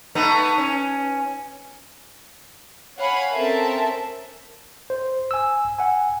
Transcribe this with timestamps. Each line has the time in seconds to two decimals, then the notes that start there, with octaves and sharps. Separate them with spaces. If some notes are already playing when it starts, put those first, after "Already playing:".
0.15 A3 B3 D#4
0.58 C#4
2.97 C#5 F5 F#5 G#5 B5
3.32 C4 C#4 A4 A#4 E5 A5
4.90 C5
5.31 G#5 E6
5.79 F#5 G#5